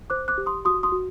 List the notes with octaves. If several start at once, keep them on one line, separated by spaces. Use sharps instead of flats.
C5 D6 F#6
D6 F#6
G4
C6 D#6
F#4 C6 D#6
C6 D#6
F#4